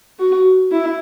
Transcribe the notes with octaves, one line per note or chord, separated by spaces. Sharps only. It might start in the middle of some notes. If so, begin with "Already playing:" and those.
F#4
E4